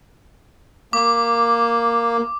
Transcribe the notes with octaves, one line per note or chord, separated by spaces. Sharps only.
A#3 D6